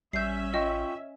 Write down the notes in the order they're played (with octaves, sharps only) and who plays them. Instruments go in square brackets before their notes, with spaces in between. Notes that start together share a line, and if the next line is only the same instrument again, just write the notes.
[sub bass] A1 [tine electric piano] G3 [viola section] C#4 E5 [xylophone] G6 C7
[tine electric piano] F4 G5 C#6 [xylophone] D#5